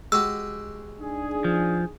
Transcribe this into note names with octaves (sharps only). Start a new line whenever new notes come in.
G#3 F#4 G4 E6
D4 D#4 G#4
F3